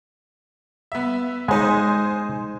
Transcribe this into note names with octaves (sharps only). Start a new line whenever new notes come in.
B3 E5
G#3 D#4 C5 G#5